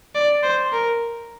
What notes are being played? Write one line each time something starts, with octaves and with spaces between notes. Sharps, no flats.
D5
C5
A#4